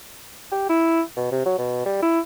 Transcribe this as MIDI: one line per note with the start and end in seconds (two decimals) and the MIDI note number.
0.52 0.69 67
0.69 1.01 64
1.17 1.29 47
1.32 1.43 48
1.46 1.56 54
1.58 1.84 47
1.86 1.99 55
2.02 2.20 64